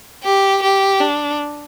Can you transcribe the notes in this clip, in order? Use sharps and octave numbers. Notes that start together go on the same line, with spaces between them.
G4
G4
D4